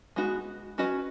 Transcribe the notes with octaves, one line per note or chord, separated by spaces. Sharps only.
G#3 B3 D#4 F#4
F#3 C#4 F#4 B4 D#5